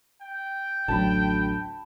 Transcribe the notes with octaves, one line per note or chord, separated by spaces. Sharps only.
G5
A1 D2 F#3 A5 B5